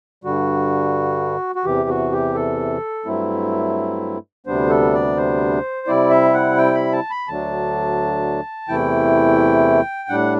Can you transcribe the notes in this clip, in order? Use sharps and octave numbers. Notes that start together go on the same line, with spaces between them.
G2 D3 G3 F#4
F#4
E2 C3 E3 G4
F#4
G4
A4
G2 F#3 A3 C4 E4
D2 C3 G3 B3 D4 C5
A4
D5
C5
C3 G3 C4 E4 D5
E5
F#5
G5
B5
A5
B5
D2 D3 F#3 A3 D4 A5
E2 C3 E3 A3 E4 G5
A2 G3 D4 F#5